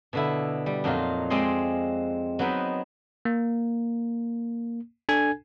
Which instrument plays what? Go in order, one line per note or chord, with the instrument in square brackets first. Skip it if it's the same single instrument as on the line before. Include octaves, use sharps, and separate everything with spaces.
[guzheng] B2 D3 E4
G3
F2 A#2 F#3 D#4 F4
G#3 C4 D5 D#5 C6
F#3 B3 C4 D#4 B4
[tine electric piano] A#3
D4 A4 G#5 G#6